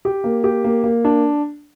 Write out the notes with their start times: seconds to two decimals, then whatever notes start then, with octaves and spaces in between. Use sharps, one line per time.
0.05 G4
0.24 A#3
0.44 G4
0.64 A#3
0.84 A#3
1.05 D4